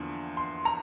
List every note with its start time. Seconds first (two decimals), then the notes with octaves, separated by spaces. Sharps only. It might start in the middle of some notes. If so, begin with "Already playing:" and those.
Already playing: E2 D3 F3 A#3 D4
0.37 C6
0.65 A#5